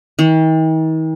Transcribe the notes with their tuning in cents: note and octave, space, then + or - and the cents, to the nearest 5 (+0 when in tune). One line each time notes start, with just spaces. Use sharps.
D#3 +45